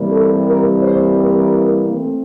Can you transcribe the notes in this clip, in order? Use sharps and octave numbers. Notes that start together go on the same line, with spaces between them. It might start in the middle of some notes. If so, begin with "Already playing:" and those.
Already playing: C3 E3 G3 A#3
A4
A#4
C5
A#4
A3 C4